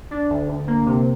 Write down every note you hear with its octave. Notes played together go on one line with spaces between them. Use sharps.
D4
D2
D2
A#3
C3